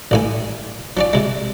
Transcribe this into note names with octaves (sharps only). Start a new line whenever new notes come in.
A1 A2 G#5
F3 C#4 D5
C3 G#3